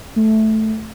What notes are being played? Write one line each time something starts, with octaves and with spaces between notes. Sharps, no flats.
A3